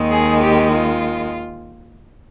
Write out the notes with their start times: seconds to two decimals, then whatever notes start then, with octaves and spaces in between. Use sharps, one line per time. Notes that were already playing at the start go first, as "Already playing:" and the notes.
Already playing: D#2 D#3 G#3
0.11 G#4
0.42 G4
0.72 F4